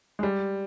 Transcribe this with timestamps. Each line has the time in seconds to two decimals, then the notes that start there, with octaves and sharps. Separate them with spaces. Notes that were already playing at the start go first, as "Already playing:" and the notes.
0.19 G#3
0.23 G3